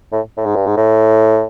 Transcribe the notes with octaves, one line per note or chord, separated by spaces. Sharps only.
A2
A2
G#2
G2
G#2
A2